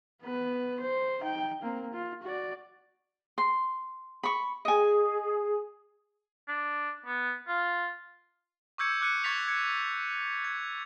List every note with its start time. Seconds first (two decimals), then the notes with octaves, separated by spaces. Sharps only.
0.22 B3 B4
0.80 C5
1.20 D#4 G5
1.62 A#3 C4
1.93 F4
2.23 F#4 D5
3.38 C6
4.23 B5 C#6
4.65 G#4 D#5 G#5
6.48 D4
7.06 B3
7.48 F4
8.78 C#6 D6 E6 G6 G#6 C#7
9.01 D6 F#6 C#7 D#7
9.24 C#6 G#6 A6 B6 F7
9.48 G#6 C#7
10.44 G#6